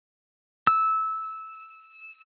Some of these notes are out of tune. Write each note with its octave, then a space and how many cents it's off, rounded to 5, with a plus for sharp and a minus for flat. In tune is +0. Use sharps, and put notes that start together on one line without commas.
E6 -15